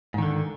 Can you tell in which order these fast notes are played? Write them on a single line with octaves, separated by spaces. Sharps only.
G#2 D#3 D3